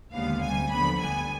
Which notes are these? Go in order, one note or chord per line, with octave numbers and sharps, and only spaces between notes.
D#2 D3 G#3 B3 F5
D2 C3 G3 G#5
D#2 D3 F3 B3 B5
D2 D3 G3 B3 G#5